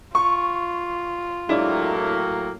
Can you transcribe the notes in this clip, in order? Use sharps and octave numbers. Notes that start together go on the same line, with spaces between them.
F4 C#6
A2 F#3 G#3 A#3 D4 E4